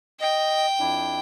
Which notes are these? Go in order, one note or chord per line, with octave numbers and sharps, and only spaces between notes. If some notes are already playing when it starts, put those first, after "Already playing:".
D#5 G5
F2 D4 E4